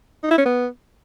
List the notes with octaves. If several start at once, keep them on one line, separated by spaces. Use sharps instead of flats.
D#4
E4
C#4
B3